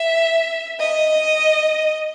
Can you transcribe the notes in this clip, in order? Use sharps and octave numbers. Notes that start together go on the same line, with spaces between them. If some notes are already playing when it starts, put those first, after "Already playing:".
Already playing: E5
D#5